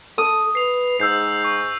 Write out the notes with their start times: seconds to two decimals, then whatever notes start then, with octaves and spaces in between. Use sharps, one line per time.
0.18 A4 D#6
0.55 B4 C7 F7
1.00 G#2 E6 G6 C7
1.44 C#6